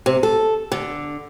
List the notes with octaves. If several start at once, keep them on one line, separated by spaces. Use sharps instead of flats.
C3
A4
D3